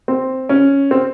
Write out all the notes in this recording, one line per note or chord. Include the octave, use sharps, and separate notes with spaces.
C4
C#4
C4